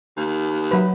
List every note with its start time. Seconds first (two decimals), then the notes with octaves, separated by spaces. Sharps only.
0.17 D#2
0.71 F#3 F#4 B4